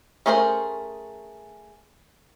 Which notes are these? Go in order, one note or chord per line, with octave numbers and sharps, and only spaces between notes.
A3 C#4 G#4 A#4 C5